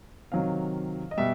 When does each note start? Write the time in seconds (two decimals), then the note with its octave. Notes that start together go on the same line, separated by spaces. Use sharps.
0.32 C3 D#3 F#3 F5
1.11 D#5
1.17 B2 G3 E5